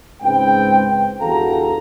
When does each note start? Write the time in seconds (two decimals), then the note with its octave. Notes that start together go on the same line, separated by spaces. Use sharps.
0.21 C#2 G#2 C4 B4 G5
1.20 G1 E2 F#4 A4 F5 A#5